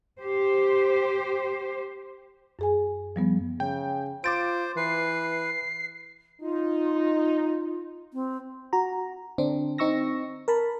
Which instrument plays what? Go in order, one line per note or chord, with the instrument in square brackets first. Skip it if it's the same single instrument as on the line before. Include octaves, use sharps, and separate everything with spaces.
[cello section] G4 C5
[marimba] F#2 G#4 G#5
F3 G3 B3
[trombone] C#3 [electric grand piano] G5
[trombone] F4 [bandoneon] C5 [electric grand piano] D6 A6 D7
[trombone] E3 [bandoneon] B4 [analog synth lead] C7
[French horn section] D#4 [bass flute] F4
[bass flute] C4
[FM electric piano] F#4 A#5
D3 C4 D4
C4 D#4 C#6 E6 A#6
A#4 A5 B5